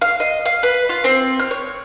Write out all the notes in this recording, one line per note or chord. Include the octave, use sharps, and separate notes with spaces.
F5
D#5
F5
B4
F4
C4
F6
C#5